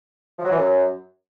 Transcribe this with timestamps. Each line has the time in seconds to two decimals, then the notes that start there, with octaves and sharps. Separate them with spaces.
0.39 F3
0.45 F#3
0.51 E3
0.58 F#2